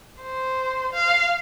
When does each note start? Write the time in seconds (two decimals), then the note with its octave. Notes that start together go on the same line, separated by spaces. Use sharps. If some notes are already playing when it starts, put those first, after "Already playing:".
0.23 C5
0.93 F5